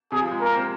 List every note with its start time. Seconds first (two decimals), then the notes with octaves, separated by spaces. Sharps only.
0.12 C3 G#4
0.22 F3
0.31 G#3
0.40 A#3 A#4
0.55 C4